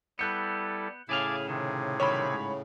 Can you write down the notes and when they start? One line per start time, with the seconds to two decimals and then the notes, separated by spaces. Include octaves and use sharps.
0.19 G3 B3 E4 A4 F#6 G6 C#7
1.09 A2 C#3 E4 G#4 F5 A5 D6 G#6
1.48 C3 D#3 G#4
2.00 D#3 F#3 G3 C#5 B5
2.33 G#2